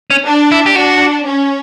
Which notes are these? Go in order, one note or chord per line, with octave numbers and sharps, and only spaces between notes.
C#4
D4
E4
G4
D4 F#4
C#4